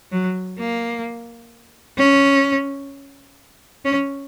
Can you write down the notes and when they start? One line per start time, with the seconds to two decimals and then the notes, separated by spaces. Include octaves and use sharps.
0.12 F#3
0.59 A#3
1.98 C#4
3.85 C#4